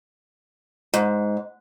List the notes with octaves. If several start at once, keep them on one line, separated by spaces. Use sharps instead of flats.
G#2